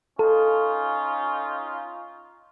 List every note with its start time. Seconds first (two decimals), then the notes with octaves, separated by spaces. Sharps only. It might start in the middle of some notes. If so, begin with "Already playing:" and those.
0.19 C#4 D#4 F4 A4